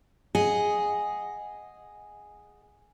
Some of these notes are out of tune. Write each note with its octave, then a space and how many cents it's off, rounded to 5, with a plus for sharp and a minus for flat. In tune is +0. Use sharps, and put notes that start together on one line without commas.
G#4 +0 D#5 +0 F#5 +0